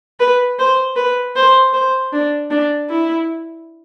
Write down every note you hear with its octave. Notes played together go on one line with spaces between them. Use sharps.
B4
C5
B4
C5
C5
D4
D4
E4